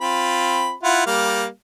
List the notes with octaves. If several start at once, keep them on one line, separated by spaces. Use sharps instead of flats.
C4 F4 B5
E4 F4 F#5
G3 A#3 F5